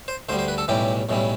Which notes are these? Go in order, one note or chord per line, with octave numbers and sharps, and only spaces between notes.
C5
D2 D3 G3 C5
C5
B4
A4
B1 A2 E3 G3 G4
B1 A2 E3 G3